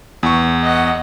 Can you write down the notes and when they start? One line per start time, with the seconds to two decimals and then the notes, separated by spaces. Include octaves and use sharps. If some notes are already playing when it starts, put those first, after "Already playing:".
0.23 E2 C#6
0.63 D#5 F#5